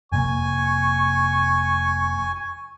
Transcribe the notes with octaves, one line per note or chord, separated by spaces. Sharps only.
F1 C3 A#3 G#5 C#6